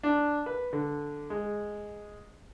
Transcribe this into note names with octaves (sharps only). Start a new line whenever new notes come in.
D4
B4
D3
G#3